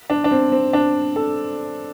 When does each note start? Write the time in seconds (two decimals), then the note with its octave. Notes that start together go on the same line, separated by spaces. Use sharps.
0.10 D4
0.24 D4
0.31 C4
0.52 C4
0.73 D4
1.16 A4